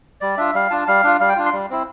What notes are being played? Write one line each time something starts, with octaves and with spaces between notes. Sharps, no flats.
G3 D5
D4 F4 E5
G3 F5
D4 F4 A5
G3 F5
D4 F4
G3 F5
G5
D4 F4
C6
G3
C4 E4